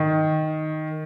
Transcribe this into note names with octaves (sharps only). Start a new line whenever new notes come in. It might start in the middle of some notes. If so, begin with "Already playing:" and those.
Already playing: D#3